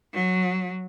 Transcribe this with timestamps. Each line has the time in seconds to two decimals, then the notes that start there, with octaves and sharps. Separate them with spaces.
0.14 F#3